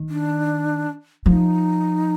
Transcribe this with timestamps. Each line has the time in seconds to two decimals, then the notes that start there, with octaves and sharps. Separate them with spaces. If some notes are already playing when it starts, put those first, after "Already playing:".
Already playing: D#3
0.09 D4
1.26 F3 D#4